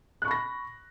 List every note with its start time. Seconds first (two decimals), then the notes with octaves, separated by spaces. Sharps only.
0.22 F#6
0.25 C#6
0.28 B5
0.31 A#6